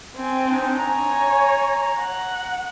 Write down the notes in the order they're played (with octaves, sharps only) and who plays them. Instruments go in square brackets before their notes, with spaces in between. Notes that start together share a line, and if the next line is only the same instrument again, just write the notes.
[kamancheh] C4 G#5
[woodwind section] D4 D#4
[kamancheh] C#5 G#5 [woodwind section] A#5
[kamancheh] F#5